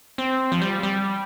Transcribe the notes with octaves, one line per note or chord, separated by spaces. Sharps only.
C4
F3
G3
G3